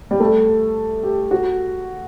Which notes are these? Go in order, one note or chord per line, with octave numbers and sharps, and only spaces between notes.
G3
A3
G4
F#4